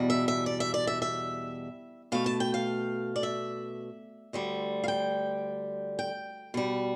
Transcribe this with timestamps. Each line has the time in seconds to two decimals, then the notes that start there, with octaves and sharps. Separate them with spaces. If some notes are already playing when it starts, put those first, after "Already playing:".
Already playing: E2 B2 G3
0.10 E5
0.28 E5
0.46 D5
0.60 E5
0.74 D5
0.87 E5
1.02 E5
2.12 B2 A3 F5
2.26 A5
2.40 G5
2.54 F5
3.16 D5
3.23 E5
4.33 D2 D3 G3
4.84 F5
4.88 G5
5.99 G5
6.54 B2 G3